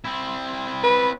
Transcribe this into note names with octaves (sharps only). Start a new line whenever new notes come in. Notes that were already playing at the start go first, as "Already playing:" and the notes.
C4 E4
B4